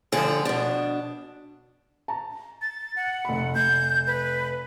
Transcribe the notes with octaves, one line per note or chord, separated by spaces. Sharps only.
G2 D3 F3 G#4
B2 D4
A5 A#5
A6
F#5
F1 B5
F1 G6
B4